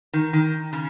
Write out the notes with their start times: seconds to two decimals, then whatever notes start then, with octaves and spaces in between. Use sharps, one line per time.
0.13 D#3
0.33 D#3
0.73 C#3